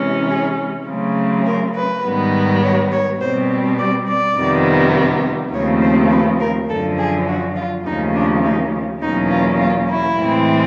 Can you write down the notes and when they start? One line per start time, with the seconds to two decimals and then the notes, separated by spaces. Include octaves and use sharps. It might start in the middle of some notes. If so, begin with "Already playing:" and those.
Already playing: C3 E3 G#3 C#4
0.30 G#4
0.88 C#3 F#3 A3 C4
1.46 A#4
1.76 B4
2.04 G#2 D#3 G3 B3
2.62 C#5
2.92 C#5
3.20 B2 G3 C4 C5
3.78 D5
4.08 D5
4.37 F2 C3 D#3 G3 B3
5.53 D#2 C#3 F3 A3 C4 C#5
5.82 C5
6.10 B4
6.40 A#4
6.69 F#2 D3 F3 A4
6.98 G#4
7.27 F#4
7.56 F4
7.86 D#2 C#3 F3 A3 C#4 D#4
8.14 D4
8.44 D#4
9.02 E2 B2 F#3 A#3 C#4 D#4
9.30 F4
9.60 F4
9.89 E4
10.18 A2 E3 G#3 C4